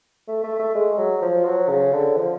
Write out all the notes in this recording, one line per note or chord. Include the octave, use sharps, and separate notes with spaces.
A3
A3
A3
G#3
F#3
F3
F#3
C#3
D3
F3